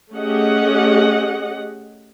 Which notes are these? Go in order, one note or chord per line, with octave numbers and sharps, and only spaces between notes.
A3 C#4 G4 G#4 D#5 F#5